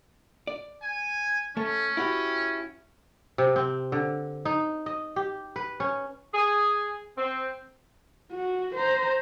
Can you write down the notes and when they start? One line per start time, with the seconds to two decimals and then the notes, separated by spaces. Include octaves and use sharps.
0.47 D5
0.82 G#5
1.57 A3 C#4
1.97 E4 F#4 G4
3.38 C3
3.56 C4
3.92 D3
4.45 D#4
4.86 D#5
5.16 G4
5.56 B4
5.80 C#4
6.34 G#4
7.17 C4
8.32 F#4
8.75 C5 A#5